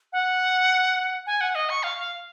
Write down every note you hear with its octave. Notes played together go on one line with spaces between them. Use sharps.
F#5
G#5
F#5
D#5
C#6
F5
F5